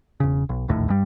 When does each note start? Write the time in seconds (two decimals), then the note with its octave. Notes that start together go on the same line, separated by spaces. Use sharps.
0.20 E1 C#3
0.49 B1
0.68 D1 A#1 D#2 A2
0.88 G2 G3